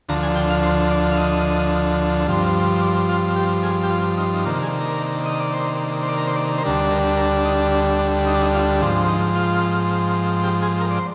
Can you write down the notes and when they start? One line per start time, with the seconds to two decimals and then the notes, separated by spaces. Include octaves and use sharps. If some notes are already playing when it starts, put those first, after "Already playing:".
0.09 D2 D3 F3 A#5
0.23 G#5
0.35 G5
0.49 F5
0.63 C5
0.91 D5
1.12 F5
1.18 D#5
2.27 G2 F3 C4
2.82 D5
3.09 F4
3.36 G4
3.63 G#4
3.83 G4
3.90 F4
4.17 D#4
4.33 D#4
4.45 C3 D#3 A#3 D4 F4
4.63 G#4
4.81 A#4
5.26 D#5
5.40 D5
5.53 C5
6.03 C5
6.09 D5
6.18 A#4
6.27 C5
6.36 D5
6.58 C5
6.63 D2 D3 G3 D4 A#4
6.90 A#4
7.17 A#4
7.45 D#4
7.72 D4
7.99 D4
8.26 D#4
8.34 D4
8.42 D#4
8.54 F4
8.81 G#2 F3 C4 D4
9.08 D#4
9.35 F4
10.44 G4
10.62 G#4
10.81 A#4
10.91 D5
10.99 C5